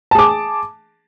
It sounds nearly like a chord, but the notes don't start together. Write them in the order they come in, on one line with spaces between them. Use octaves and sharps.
A5 G#4 D6